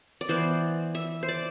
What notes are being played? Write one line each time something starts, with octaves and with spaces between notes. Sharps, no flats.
D5
E3 B3 C5
E5
C5
D5